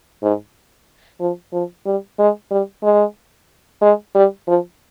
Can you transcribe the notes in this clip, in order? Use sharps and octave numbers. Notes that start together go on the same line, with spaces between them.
G#2
F3
F3
G3
G#3
G3
G#3
G#3
G3
F3